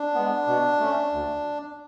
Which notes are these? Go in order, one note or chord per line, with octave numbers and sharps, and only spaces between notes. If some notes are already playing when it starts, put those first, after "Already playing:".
Already playing: D4
G#3 B3
B2
A3 C#4
D2